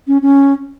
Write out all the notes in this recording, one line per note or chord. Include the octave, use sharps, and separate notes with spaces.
C#4
C#4